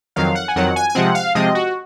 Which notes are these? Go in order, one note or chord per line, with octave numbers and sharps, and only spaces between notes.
F2 D#3 F#3 F5
F#5
G#5
F2 D#3 F#3 F#5
G#5
G#5
C3 F3 G#3 C4 F#5
F5
C3 F3 G#3 C4 D#5
F#4